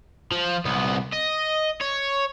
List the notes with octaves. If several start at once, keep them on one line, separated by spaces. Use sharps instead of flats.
F3
C2 B3
D#5
C#5